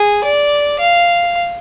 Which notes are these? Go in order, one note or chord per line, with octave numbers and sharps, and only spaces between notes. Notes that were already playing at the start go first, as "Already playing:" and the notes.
Already playing: G#4
D5
F5